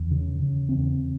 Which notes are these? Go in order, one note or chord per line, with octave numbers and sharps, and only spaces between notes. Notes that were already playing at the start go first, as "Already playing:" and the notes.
Already playing: E2
C#3
C#3
E2 C4